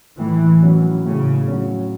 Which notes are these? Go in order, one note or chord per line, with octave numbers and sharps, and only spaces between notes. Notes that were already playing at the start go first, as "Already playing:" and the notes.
A2 E3
F#3 C#4
A2 C#3
F#3 C#4